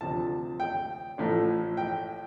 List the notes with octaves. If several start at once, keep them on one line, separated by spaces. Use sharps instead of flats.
D2 C3 F3 A5
G5
A1 A2 F3 A3
G5